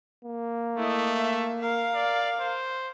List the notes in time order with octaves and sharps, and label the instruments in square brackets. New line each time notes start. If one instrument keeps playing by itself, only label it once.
[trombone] A#3
[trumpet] A3 [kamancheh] E4 D#5
[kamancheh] E5
A#4 F5
[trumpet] D5
C5